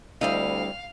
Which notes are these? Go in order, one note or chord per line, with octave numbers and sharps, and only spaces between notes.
D2 G2 G3 C4 E4 D#5 F5